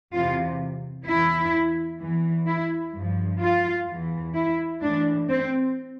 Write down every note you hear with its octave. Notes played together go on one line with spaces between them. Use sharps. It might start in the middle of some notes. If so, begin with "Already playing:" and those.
E2 C3 E3 F4
E2 E3 E4
E2 E3
E4
G2 F3
F4
E2 E3
E4
A2 E3 D4
C4